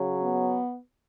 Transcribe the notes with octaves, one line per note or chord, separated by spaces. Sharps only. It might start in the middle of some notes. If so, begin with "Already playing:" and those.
Already playing: C#3 F#3
B3